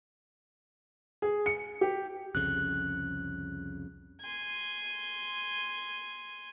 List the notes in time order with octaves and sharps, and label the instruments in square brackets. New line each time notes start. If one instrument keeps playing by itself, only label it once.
[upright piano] G#4
C#7
G4
[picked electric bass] C2 F2 C#3 [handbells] F#6
[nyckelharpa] G#5 C6